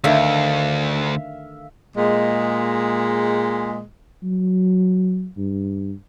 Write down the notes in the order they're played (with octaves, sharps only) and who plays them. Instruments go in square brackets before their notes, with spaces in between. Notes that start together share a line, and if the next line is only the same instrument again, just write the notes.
[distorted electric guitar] D2 [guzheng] D3 D#3 A3 [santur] E5 F5
[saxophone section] A#2 G#3
[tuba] F#3
G2